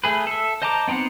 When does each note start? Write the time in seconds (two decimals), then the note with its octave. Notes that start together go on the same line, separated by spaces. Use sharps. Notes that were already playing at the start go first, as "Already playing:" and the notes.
0.04 A3 G#4 B4
0.27 A4 E5
0.62 C5 D#5 A5 A#5 D6
0.88 B3 C4 D#4 C5 F#5